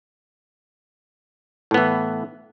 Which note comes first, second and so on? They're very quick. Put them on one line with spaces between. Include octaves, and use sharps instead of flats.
A2 B3 E3